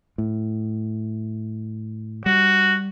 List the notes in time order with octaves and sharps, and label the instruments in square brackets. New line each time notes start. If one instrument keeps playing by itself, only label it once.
[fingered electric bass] A2
[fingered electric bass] G3 [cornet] F#4